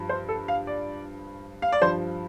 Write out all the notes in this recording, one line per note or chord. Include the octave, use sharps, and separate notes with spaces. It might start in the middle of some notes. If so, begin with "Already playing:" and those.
Already playing: G2 F3
C5
A4
F5
D5
F5
D5
G2 F3 C5